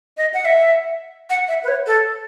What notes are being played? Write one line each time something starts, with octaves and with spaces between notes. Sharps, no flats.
D#5
F#5
E5
F#5
E5
B4
C#5
A4